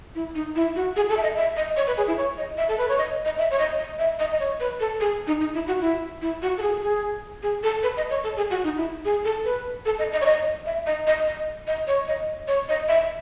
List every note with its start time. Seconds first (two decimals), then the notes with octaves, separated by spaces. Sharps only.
0.15 E4
0.35 D#4
0.55 E4
0.76 F#4
0.96 G#4
1.10 A4
1.17 E5
1.23 D#5
1.36 E5
1.57 D#5
1.77 C#5
1.87 B4
1.97 G#4
2.07 E4
2.17 C#5
2.38 D#5
2.57 E5
2.68 A4
2.78 B4
2.89 C#5
2.98 D#5
3.25 D#5
3.38 E5
3.51 C#5
3.59 D#5
3.79 D#5
3.99 E5
4.19 D#5
4.32 D#5
4.40 C#5
4.60 B4
4.80 A4
5.00 G#4
5.27 D#4
5.40 D#4
5.54 E4
5.68 F#4
5.81 E4
6.22 E4
6.42 F#4
6.58 A4
6.62 G#4
6.82 G#4
7.43 G#4
7.63 A4
7.83 B4
7.97 D#5
8.10 C#5
8.24 A4
8.37 G#4
8.50 F#4
8.64 D#4
8.77 E4
9.05 G#4
9.25 A4
9.45 B4
9.86 A4
9.99 D#5
10.12 D#5
10.21 C#5
10.26 D#5
10.66 E5
10.87 D#5
11.07 D#5
11.27 D#5
11.67 D#5
11.87 C#5
12.07 D#5
12.48 C#5
12.69 D#5
12.88 E5